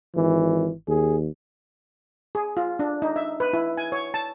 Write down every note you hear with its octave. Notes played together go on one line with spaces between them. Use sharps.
G#1 E3
D#2 G#4
G#4
F4
D4
D#4
E5
B4
E4
G#5
C#5
A5